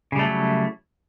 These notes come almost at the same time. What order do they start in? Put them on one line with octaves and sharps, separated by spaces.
C#3 G3 A3 F#3 E4